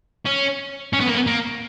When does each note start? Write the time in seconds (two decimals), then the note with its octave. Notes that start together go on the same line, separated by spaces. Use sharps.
0.25 C#4
0.93 C#4
1.00 B3
1.07 A#3
1.15 B3
1.27 A#3